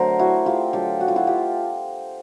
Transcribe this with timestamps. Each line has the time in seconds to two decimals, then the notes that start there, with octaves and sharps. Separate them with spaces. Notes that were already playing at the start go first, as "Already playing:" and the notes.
Already playing: D3 F#3 A3 A#4 C5
0.19 E4 F#4
0.46 F4 G4
0.73 D3 F#3 A3 G4 A4
1.01 F#4
1.08 F4
1.16 E4 F#4
1.27 F4 G4